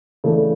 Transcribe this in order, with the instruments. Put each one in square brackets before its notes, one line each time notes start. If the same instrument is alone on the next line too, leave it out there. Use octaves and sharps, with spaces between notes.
[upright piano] C#3 E3 A3 D4 A4